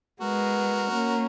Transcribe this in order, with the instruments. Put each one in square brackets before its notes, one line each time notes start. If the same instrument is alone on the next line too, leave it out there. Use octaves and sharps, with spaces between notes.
[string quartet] G#3 B3 [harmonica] F#4 A#4
[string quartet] A#3 C#4